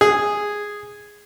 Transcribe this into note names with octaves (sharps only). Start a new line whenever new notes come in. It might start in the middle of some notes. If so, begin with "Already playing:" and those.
G#4